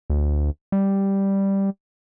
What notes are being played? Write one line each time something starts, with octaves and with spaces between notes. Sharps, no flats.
D2
G3